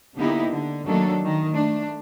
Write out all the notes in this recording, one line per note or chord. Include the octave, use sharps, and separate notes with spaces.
D3 A#3 B3 D#4 E4 G4
D3
D#3 F#3 A3 A#3 D4 A4
D#3
A3 D4